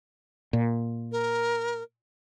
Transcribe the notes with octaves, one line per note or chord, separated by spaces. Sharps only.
A#2
A#4